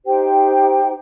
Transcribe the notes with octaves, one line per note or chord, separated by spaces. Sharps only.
D#4 G4 C5 G5